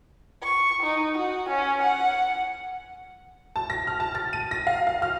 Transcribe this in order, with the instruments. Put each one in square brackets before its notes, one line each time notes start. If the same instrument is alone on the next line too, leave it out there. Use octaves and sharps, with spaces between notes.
[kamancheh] C#6
D#4
F#4
C#4
F#5
[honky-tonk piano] A5
A#6
F6
A5
A6
D#7
A#6
F5
F5
F6